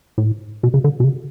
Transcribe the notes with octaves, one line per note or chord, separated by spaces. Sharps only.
A2
B2
C#3
D3
B2
C#3